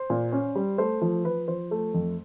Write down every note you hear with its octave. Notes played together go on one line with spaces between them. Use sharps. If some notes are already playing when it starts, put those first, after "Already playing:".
Already playing: C5
A#2
C#4
G3
A3 C5
F3 C5
F3 B4
F3 C5
A3
F2